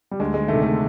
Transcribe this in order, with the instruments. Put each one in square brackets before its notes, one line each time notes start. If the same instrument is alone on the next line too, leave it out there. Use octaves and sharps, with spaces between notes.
[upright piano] G3
[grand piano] D2 [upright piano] G#3
[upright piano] G#3
[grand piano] C3 D#3 [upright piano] A3
[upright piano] A3